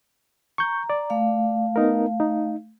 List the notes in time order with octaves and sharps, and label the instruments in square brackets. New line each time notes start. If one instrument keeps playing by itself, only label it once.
[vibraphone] A#5 [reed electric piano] C#6 G6
[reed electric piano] D5
[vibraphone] A3 F5
[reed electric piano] B3 D#4 A#4
D#4